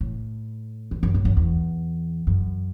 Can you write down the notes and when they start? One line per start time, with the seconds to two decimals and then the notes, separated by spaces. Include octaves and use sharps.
0.01 A2
0.91 E2
1.03 F#2
1.15 A2
1.25 F#2
1.37 E2
2.27 F#2